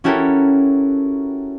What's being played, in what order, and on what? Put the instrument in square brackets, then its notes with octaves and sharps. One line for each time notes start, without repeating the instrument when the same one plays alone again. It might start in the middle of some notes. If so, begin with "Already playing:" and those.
[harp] C#4 E4 F#4 G4 A4 A#4